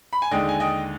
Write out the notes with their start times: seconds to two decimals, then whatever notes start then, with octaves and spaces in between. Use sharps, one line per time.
0.13 B5
0.22 G#5
0.31 D#2 D3 G#3 D#5 G5
0.49 G#5
0.60 D#5 G5